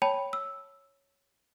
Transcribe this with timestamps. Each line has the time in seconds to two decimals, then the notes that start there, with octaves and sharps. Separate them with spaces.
0.02 C#5 G5 A5 B5
0.33 E6